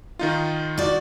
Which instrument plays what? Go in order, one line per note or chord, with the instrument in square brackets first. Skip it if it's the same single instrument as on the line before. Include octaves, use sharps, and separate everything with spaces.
[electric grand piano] D#3 D#4 F4
[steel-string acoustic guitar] F#4 D5